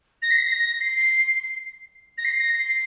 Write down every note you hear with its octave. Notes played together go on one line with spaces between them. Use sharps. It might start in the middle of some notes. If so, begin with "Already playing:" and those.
A#6
C7
A#6
A#6
C7
A#6
C7
A#6
C7